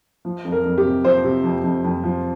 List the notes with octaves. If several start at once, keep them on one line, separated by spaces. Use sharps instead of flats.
F3
F2
A#4
F2
G4
C3
F3 C5
C3
F2
F2
F2
F3